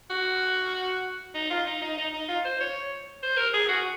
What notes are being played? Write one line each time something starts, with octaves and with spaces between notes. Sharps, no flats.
F#4
D#4
F4
D#4
D#4
D#4
D#4
F4
C5
C#5
C5
A#4
G#4
F#4